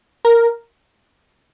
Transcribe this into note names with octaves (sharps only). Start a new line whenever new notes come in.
A#4